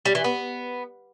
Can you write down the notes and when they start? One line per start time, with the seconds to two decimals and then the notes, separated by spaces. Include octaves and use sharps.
0.05 G3
0.15 E3
0.24 B3